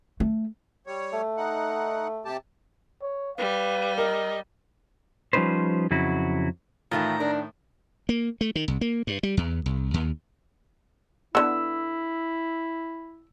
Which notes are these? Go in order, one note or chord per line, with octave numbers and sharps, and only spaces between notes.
A3
G3 C#5
A3
D#4 F#5
C3 G4 A5
C#5
G3 B4 F5
A#4 D#5
F3 G3 C#4 D#4 B4 C5
F2 C#3 F#3 E4 F#4
A2 D#3 E3 A3 F4 E5 A#5
D4 A#4
A#3
A3
D#3
C2
A#3
G2
G3
E2
C2
D#2
D3 B3 E4 E6